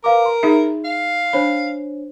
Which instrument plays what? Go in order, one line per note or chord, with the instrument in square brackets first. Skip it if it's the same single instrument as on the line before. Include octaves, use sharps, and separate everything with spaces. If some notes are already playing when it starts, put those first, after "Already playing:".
[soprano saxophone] A#4 [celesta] B4 F5 D6
[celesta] C6
[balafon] D#4 G#4 E5
[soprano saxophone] F5
[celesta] D4 C5 C#5 [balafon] B5